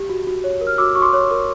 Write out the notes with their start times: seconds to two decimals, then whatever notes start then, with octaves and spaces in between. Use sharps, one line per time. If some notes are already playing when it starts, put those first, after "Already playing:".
Already playing: G4
0.09 F#4
0.27 F#4
0.44 C#5
0.61 A#4
0.67 F6
0.78 F#4 D6 E6
0.95 F#4 C#6
1.02 C6 D6
1.13 C#5
1.31 A#4